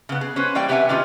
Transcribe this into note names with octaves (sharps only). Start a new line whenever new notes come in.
C#3 B3
G#4
C#4 B4 C5
E3 G3 A#3 D5 G5
C3 G4 B4 E5 F#5 G#5
D#3 C#4 F4 A#4 B4